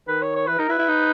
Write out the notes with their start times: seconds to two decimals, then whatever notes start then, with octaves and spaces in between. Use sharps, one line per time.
0.08 D#3 B4
0.22 C#5
0.35 C#5
0.47 E3 B4
0.59 D#4 A#4
0.69 E4 B4
0.79 E4
0.88 D#4